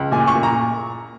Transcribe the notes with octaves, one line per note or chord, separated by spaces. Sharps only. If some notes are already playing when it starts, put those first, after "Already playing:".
Already playing: C#2
A#2 G#5
C#6
A#2
A#5